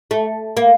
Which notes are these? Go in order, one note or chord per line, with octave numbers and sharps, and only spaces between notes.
A3
A#3